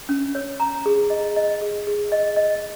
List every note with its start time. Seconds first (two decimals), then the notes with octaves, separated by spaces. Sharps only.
0.09 C#4
0.35 C#5
0.60 A#5
0.86 G#4
1.10 D#5
1.36 D#5
1.62 G#4
1.87 G#4
2.12 D#5
2.36 D#5